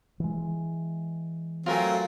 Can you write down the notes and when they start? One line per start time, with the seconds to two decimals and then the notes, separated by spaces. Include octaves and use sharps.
0.20 E3 G#3
1.66 F#3 A3 C4 F4 A#4 G#5